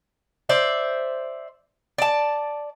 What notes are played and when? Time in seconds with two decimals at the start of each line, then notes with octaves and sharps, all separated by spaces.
0.49 C5 D5 E5
1.98 D5 A5